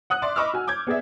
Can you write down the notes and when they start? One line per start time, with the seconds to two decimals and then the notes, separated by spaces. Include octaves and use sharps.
0.10 F#5 D#6 F#6
0.22 D5 E5 C6 D6
0.36 D#5 B5 C#6 D6 E6 F6
0.54 F#4 G#5
0.68 D6 G6 G#6
0.87 B3 G#4 D5 E5